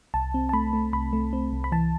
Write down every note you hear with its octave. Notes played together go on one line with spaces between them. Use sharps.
C2 A5
C4
A5
A3 B5
A3
C2 B5
A3
C4
C2
B5
E3 A5